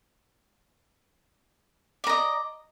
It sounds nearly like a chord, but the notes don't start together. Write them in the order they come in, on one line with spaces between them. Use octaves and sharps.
D5 A#5 D#5